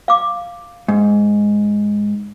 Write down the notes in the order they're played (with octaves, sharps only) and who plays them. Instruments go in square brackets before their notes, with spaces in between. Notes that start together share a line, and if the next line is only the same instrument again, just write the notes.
[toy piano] F5 D6
[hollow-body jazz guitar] G#2